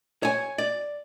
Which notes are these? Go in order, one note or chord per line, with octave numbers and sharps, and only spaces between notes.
C#5 G#5
D5